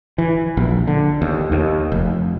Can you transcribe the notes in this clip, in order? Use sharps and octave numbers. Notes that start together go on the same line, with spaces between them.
E3
A#1
D3
D#2
D#2
F1